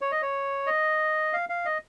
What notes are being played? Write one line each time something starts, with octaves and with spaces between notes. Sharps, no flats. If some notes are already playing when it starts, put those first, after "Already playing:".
C#5
D#5
C#5
D#5
F5
F5
D#5